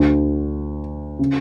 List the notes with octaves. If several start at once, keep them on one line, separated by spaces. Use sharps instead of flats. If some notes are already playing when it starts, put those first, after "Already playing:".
Already playing: D2 D3
C#3